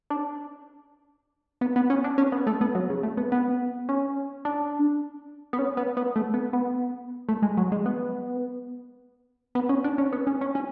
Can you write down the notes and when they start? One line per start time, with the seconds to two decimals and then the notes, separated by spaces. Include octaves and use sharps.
0.10 D4
1.61 B3
1.76 B3
1.90 C#4
2.04 D4
2.18 C#4
2.32 B3
2.47 A3
2.61 B3
2.75 F#3
2.90 C#3
3.03 A3
3.17 B3
3.32 B3
3.89 C#4
4.45 D4
5.53 B3
5.59 C#4
5.77 B3
5.97 B3
6.16 A3
6.34 B3
6.53 B3
7.29 A3
7.42 G#3
7.57 F#3
7.72 G#3
7.86 B3
9.55 B3
9.69 C#4
9.84 D4
9.98 C#4
10.13 B3
10.27 C#4
10.41 C#4
10.55 C#4